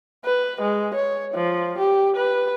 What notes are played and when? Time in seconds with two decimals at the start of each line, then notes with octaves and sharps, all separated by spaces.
0.25 B4
0.62 G#3
0.94 C#5
1.35 F3
1.78 G4
2.16 B4